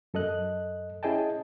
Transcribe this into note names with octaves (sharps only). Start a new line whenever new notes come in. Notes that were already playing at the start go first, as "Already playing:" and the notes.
F#2 A4 D#5 F#6
C#4 E4 G#4 D#5 G5 A5